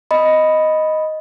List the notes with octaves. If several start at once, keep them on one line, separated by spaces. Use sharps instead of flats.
D#5 B5